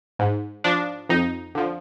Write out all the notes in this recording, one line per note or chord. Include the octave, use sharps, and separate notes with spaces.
G#2
F3 D4
F2 D#4
D3 F3